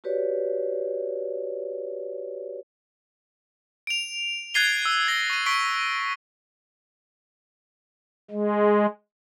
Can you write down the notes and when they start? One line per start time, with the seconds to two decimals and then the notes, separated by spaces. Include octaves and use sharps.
0.04 F#4 G4 B4 C#5 D5
3.87 D7 F7
4.54 F#6 G#6 A6 C7 D#7 G7
4.85 E6
5.08 G#6 A#6 G7
5.30 C#6 D#7
5.46 C#6 B6 D7 D#7 G7
8.31 G#3